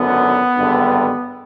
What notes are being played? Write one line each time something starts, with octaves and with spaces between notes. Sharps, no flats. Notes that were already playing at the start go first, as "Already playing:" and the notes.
Already playing: G#1 F#2 D3 B3
G#1 G2 D3 G3